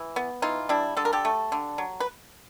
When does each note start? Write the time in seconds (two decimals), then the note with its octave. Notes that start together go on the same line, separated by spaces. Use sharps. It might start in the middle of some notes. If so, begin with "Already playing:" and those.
Already playing: E3
0.16 B3
0.42 E3 D#4 F4
0.69 G3 D4 E4
0.97 D3 A4
1.05 A#4
1.13 G4 A4
1.25 A3
1.52 D3
1.78 F#3
2.00 B4